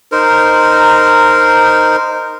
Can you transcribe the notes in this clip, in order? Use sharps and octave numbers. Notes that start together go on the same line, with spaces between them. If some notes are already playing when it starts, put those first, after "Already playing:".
D#4 A#4 C5